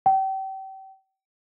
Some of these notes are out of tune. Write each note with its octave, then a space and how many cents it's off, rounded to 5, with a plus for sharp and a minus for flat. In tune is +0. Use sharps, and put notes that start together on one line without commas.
G5 -35